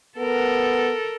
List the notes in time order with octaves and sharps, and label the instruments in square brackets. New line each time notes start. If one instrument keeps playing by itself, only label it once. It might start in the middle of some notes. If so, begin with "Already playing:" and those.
[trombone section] B3 [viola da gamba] A4 A#4